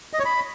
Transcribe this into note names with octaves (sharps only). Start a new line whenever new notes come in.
D#5
C#5
B5